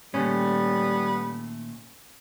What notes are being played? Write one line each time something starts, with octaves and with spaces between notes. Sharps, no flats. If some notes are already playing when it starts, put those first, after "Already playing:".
A#2 D#3 G3 A3 B3 C#4